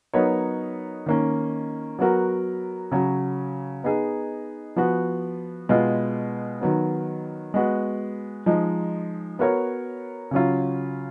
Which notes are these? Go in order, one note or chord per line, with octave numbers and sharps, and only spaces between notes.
F#3 B3 D#4 A#4 C#5
D#3 A#3 C#4
F#3 B3 F#4 A#4
C#3 F#3 C#4
B3 D#4 G#4
F3 B3 F#4
B2 G#3 B3 F4
D#3 F#3 B3
G#3 B3 F#4
F3 G#3 D#4
B3 F#4 A#4 C#5
C#3 F#3 C#4 F4